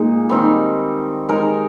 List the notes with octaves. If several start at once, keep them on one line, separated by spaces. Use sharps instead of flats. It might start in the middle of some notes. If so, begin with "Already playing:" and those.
Already playing: A#2 G#3 D#4
D#3 G3 C4 D#4
G#3 D#4 A#4